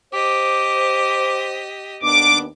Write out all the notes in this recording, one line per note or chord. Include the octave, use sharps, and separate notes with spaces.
G4 C5 D#5 D6
D#2 B3 D4 D6